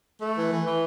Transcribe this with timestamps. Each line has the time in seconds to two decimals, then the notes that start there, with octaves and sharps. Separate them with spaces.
0.21 A3
0.35 E3
0.51 E3
0.66 E3